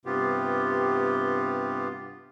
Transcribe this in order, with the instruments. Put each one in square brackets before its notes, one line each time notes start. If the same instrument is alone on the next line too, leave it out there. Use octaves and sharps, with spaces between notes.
[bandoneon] G2 C3 B3 F4 G4